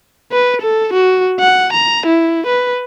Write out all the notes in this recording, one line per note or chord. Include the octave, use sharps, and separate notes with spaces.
B4
A4
F#4
F#5
A#5
E4
B4